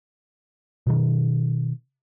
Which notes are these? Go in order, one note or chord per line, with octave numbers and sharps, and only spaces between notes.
B2 D#3